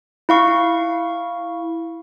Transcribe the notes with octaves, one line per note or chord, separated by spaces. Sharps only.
E4 F5 C#6